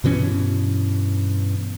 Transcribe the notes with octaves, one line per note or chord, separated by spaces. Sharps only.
G2 B2 E3 C#4